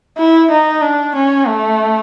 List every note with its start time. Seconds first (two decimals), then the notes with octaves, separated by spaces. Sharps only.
0.18 E4
0.50 D#4
0.82 D4
1.15 C#4
1.47 A3